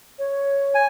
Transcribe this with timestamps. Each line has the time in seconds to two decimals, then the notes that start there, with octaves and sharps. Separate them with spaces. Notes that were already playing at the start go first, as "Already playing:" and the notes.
0.19 C#5
0.75 G#5